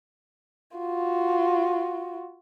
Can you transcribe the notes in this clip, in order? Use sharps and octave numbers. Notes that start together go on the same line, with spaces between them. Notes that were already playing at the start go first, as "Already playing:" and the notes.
F4 F#4